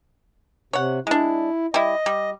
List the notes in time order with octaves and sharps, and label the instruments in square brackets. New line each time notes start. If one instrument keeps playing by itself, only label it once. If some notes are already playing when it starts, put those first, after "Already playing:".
[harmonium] C3 [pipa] C#5 F#5
[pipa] G#3 D4 [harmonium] E4
[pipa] G3 E4 [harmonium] D#5
[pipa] G3